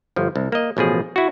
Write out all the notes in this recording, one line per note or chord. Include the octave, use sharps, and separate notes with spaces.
G1 F3
C2
A#3 D#5
A1 B2 F3 G#4
E4 F#4